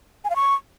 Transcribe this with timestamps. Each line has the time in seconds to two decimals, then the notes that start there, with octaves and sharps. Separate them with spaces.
0.24 G#5
0.30 F5
0.36 C#6